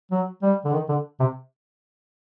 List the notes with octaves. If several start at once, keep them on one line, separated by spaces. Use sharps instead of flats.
F#3
G3
D3
D#3
D3
C3